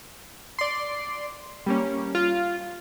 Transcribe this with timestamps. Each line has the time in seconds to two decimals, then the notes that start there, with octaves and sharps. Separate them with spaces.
0.59 D5 C6
1.66 G3 A#3 C#4
2.15 F4